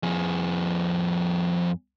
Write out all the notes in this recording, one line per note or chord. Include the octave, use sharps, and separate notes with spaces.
F2 G#4